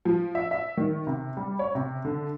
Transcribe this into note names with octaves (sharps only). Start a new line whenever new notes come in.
F3
E5
E5
D#3
C3
G3
C#5
C3
D3